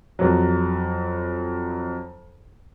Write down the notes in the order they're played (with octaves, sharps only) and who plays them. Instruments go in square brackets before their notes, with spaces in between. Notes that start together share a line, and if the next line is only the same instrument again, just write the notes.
[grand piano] F2 F#3